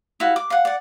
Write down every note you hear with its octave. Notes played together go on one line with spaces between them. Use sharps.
E4 F#4 F5
D6
F5 F#5
D5 F#5